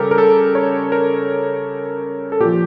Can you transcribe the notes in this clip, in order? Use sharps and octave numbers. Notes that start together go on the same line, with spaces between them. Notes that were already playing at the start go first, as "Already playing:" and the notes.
Already playing: C#3 G3 G4 A4 A#4
A#4
A4
C#5
A#4
A4
A#2 F3 G4